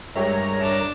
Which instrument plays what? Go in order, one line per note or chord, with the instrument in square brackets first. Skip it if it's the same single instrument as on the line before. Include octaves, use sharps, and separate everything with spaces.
[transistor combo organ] G2 A#4 A#5 [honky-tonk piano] G#3 G4 E5 [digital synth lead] C#5
[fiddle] D4 [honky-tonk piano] E5